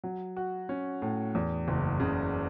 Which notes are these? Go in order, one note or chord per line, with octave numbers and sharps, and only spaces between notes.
F#3
F#4
C#4
A2
E2
F#1
C#3